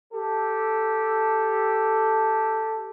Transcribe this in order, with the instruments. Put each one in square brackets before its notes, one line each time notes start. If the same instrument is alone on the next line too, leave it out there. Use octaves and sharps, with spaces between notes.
[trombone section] G4 A4